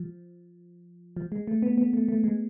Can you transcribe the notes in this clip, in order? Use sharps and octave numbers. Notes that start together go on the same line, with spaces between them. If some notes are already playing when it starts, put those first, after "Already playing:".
Already playing: F3
F3
G#3
A3
B3
B3
A3
A3
G#3